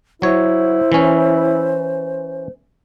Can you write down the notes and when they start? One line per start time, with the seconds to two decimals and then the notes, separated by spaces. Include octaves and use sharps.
0.22 F#3 E4 C5 C#5
0.92 E3 C#4